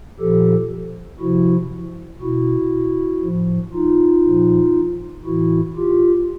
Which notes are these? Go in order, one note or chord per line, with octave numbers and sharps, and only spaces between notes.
A#2 F3 G4 A4
C3 F3 E4 F#4
B2 E4 F#4
A2 F3
D#4 F4
A#2 F3
A2 E3 E4 F#4
F4 G4